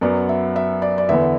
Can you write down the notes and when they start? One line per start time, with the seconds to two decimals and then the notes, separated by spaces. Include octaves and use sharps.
0.01 F#2 F#3 B3 D5
0.29 E5
0.56 E5
0.82 D5
0.98 D5
1.09 E2 D3 B3 E5